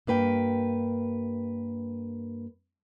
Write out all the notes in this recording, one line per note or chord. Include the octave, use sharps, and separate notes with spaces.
G2 A#3 B4 G5